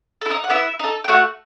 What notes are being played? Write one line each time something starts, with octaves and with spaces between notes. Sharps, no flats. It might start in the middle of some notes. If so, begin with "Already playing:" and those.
A4
E4
D#4 D#5
F#5
B3 E4 E5
D#4 A4
G5
A3 F#4 F#5